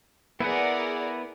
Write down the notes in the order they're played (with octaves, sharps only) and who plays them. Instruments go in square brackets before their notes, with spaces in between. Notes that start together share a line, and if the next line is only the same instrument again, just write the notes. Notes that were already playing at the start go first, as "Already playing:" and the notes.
[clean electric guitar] B3 [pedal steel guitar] E4 B4 F#5 [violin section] G#4 A#4 D5